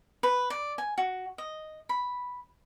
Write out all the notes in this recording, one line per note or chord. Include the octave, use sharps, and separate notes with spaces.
B4
D5
G#5
F#4
D#5
B5